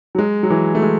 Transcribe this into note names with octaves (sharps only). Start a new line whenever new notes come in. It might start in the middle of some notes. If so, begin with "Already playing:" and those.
F#3
G#3
F#3
E3
A3
G#3